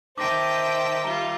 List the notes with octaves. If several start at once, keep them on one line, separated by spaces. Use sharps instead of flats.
D#3 C5 D#5 E5 G5 A5 D6 A#6
G3 F4 A#5 G7